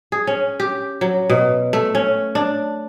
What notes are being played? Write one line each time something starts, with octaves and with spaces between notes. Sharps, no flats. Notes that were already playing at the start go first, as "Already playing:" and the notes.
G#4
C#4
G4
F#3
B2
A3
C#4
D4